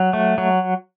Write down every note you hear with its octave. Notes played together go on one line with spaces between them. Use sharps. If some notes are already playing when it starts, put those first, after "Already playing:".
Already playing: F#3
A3
F#3